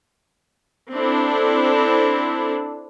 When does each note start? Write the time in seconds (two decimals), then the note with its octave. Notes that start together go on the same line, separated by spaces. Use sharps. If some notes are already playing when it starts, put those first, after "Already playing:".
0.92 C4 D4 E4 A4